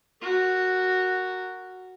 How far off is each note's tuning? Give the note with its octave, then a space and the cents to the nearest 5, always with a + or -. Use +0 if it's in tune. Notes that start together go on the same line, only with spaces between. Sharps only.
F#4 +0 A#4 -10